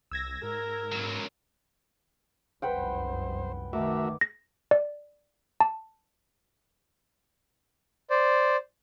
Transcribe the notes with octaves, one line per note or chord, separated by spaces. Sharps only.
C2 E6 G#6 A#6
G#2 A#4
C#2 F#3
F1 C2 F#2 B4 C5 F#5 G5
D#3 A3 F#4 A#4 E5 D6
A#6
D5
A5
C5 D5